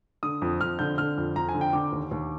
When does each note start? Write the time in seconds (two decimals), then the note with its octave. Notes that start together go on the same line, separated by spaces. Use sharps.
0.23 D3 D#6
0.42 F2
0.61 F2 F6
0.79 D3 G6
0.98 D3 F6
1.17 F2
1.36 F2 A#5
1.49 G#5
1.55 D3
1.61 G5
1.73 D3 D6
1.92 D#2
2.11 D#2